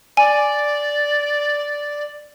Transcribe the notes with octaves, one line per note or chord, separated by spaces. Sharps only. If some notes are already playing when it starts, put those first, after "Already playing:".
D5 G#5